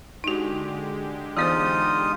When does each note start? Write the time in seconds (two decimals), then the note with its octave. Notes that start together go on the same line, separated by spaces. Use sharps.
0.24 D3 G#3 D#4 F#4 G4
1.37 E3 B3 D#4 F4 C5 D#6